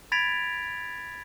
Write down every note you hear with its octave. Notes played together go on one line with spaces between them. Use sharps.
B5 G#6 A6 B6 D7 F7